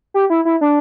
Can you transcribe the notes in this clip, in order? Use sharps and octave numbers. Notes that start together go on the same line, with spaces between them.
G4
E4
E4
D4